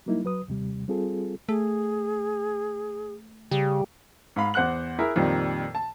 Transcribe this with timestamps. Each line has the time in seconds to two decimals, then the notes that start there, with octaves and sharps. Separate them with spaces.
0.06 F#3 G3 A#3 D#4 E4
0.24 F#3 B4 D#6
0.48 D#2 C3 G3
0.88 G3 C4 F4 G#4 A4
1.49 A3 G#4
3.51 C#3 G3 G4
4.36 G#2 F5 B5
4.54 E2 C5 F#5 F#6 F#7
4.99 E4 G#4 A#4 A#5
5.16 F2 A#2 D#3 F3 G3
5.75 A5